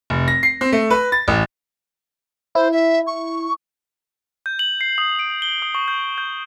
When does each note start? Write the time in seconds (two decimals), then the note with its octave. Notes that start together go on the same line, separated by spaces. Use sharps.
0.10 F1
0.28 A#6
0.43 C7
0.61 C4
0.72 A3
0.90 B4
1.12 A6
1.28 A1
2.55 E4 C5
2.72 E5
3.07 C#6
4.46 G6
4.59 F#7
4.81 C7
4.98 D#6
5.19 D7
5.42 G7
5.62 D#6
5.75 C#6
5.88 G6
6.18 G6